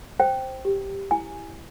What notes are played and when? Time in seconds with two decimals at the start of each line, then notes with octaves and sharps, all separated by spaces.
0.20 C5 G5
0.65 G4
1.11 E4 G#5